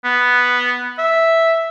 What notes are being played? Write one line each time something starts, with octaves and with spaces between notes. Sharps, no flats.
B3
E5